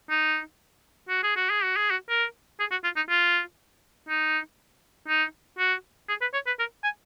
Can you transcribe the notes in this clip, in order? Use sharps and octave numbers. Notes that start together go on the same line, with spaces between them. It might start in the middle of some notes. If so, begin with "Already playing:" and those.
D#4
F#4
G#4
F#4
G#4
F#4
G#4
F#4
A#4
G#4
F#4
F4
D#4
F4
D#4
D#4
F#4
G#4
B4
C#5
B4
A#4
G#5